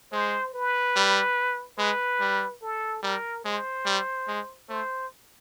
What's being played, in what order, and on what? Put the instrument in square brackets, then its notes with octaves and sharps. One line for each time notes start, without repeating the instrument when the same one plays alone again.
[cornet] G#3 [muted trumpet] C5
[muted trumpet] B4
[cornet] G3
[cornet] G#3 [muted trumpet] B4
[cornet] G3
[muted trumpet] A4
[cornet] G3 [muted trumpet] A#4
[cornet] G#3 [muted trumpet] C5
[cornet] G3
G#3
[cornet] A3 [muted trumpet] C5